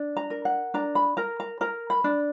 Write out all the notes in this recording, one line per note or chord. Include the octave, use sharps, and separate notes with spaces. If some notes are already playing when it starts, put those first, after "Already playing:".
Already playing: D4
A#5
A#4
F#5
D4 A#5
B5
A#4 A#5
A#5
A#4 A#5
B5
D4